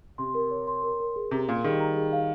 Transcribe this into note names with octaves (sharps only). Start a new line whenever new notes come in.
C3 C6
A#4
C#5
C6
A#4
A#4
G#4
C3 A#5
A#2 F5
D#3 G3 G#4
A#5
G#4
F5